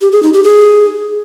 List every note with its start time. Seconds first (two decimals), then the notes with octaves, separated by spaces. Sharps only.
0.01 G4
0.12 G#4
0.23 D#4
0.33 G4
0.44 G#4